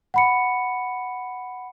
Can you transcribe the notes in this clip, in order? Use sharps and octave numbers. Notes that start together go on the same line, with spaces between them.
F#5 B5 C#7